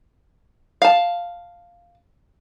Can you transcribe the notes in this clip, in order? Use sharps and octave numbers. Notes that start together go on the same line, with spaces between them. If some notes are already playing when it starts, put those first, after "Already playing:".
F5 A5